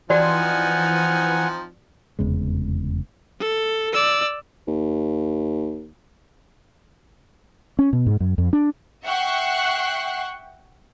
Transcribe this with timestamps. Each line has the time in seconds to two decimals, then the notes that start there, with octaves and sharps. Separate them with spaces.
0.10 E3 F3 C4 D#4 F#4 D5 F#5 G#5
2.19 F1 E2 C#3 G#3
3.40 A4
3.93 D5 E6
4.68 D#2
7.79 C#4
7.93 B2
8.07 G#2
8.20 F#2
8.38 F2
8.53 D4
9.04 E5 F#5 G5 C#6 F#6 C7